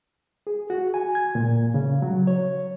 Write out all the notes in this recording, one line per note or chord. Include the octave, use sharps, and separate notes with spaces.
G#4
F#4
G#5
G#6
A#2
C#3
F#3
C#5